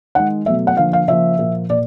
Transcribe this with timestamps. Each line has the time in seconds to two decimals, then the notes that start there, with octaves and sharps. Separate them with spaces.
0.15 D#3 G#3 F#5
0.46 B2 F#3 A3 E5
0.67 F#5
0.77 D3 F3 A#3 F5
0.93 F5
1.08 C#3 F3 A#3 E5
1.39 A#2 F3 A#3
1.70 A#2 D5